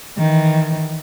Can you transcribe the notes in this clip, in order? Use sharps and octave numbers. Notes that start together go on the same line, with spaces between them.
D#3 E3